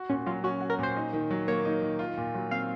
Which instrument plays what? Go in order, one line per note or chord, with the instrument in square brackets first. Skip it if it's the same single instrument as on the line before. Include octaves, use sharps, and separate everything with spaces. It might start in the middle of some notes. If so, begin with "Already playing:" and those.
Already playing: [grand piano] F#4
[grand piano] A#2 [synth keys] C#4
[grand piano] F#3 [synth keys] F4
[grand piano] C#4 [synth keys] F#4
[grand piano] F#4
[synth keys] A#4
[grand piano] A#2 [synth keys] C5
[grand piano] D#4
D#3
F#3
[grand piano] A#3 [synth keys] C#5
[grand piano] D#4
D#3
F4
A#2
F#3
[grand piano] C4 [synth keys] F5